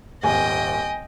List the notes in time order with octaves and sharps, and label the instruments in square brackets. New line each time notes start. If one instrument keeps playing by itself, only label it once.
[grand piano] D#1 G#1 [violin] D#5 G5 [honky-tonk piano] G#5